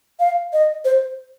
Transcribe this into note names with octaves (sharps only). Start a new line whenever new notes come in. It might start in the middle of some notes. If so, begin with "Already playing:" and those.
F5
D#5
C5